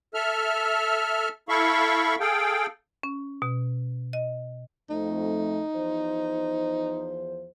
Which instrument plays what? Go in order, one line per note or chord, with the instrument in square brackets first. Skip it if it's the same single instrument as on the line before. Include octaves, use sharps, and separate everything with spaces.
[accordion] A4 E5 F6
E4 A4 F5 B5 C#6
G#4 A4 F5 G5
[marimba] C#4
B2
D#5
[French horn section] F2 A3 [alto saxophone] D#4
[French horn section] E2 F3 C5